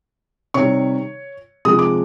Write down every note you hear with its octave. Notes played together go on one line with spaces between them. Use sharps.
C3 D#3 G3 C#5 C#6
C3 F3 G#3 D#6
D6